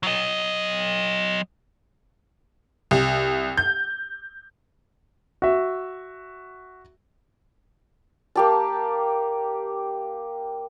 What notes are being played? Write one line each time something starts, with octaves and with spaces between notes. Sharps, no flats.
F#3 D#5
C2
G6
F#4 E5
A#3 G4 A5